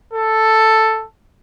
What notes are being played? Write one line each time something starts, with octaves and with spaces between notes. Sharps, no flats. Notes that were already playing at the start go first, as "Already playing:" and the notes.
A4